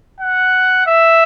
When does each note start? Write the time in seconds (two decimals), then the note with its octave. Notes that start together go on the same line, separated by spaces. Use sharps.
0.20 F#5
0.87 E5